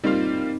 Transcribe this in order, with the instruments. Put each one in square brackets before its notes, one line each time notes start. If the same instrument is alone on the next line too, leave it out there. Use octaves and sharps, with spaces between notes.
[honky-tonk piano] G3 A#3 F4 [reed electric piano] C4 D#4